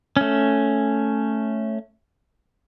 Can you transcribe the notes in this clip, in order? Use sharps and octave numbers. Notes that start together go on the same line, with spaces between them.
A3 C#4